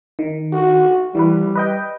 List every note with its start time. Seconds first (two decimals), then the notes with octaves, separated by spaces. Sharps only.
0.19 D#3
0.53 F#4
1.15 E3 G3 B4
1.56 B4 D#5 G5